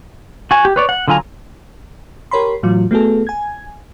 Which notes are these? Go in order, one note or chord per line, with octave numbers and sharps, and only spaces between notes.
F#4 G#5
G4
B4 C#5 D5
F#5
D3 F#3 F4 G#5 A#5
G4 A#4 C#5 B5 C6
A2 E3 F#3 F4
A3 B3 F#4 G#4 A4
G#5 G#6